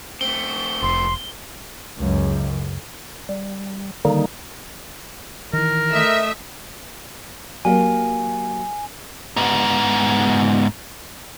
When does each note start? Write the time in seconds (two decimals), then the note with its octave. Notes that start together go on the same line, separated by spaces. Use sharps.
0.21 A3 C4 G7
0.82 F1 C6
1.98 C#2 F#2
3.29 G3
4.05 D3 D#3 G3 A#3 D#4
5.53 D#3 E3 A#4
5.91 A3 D#5 E5
7.65 F#3 A#3 G4 G#5
9.37 G#2 B3